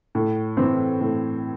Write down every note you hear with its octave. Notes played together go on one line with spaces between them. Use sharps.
A2
E3 C4
A2